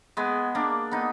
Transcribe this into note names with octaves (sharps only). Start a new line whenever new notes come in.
G#3 B3
A#3 D4
B3 D#4